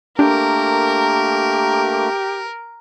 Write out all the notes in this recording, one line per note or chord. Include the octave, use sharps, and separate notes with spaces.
A3 A#3 D4 G4 A#4